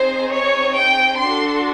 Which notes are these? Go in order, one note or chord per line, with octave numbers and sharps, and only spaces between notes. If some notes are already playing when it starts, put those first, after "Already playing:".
Already playing: C4 D#4 G#4 C5
C#5
G5
D4 F#4 A4 C6